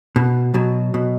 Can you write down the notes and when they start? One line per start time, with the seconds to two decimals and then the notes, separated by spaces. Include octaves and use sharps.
0.16 B2
0.54 B2 F#3
0.94 B2